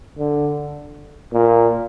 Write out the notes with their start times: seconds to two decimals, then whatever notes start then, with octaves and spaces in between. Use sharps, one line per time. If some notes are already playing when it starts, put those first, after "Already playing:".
0.18 D3
1.33 A#2